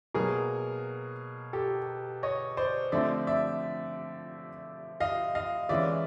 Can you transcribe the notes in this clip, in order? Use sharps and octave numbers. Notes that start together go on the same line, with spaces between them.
B2 F#3 A#3 G#4 A#4
G4 A4
C#5 D#5
C5 D5
D3 F3 A3 C4 D5 E5
D5 E5
D#5 F5
D#5 F5
E3 G#3 C#4 D5 E5